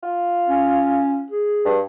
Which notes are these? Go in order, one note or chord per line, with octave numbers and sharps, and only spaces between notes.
F4
C#4
G#4
G2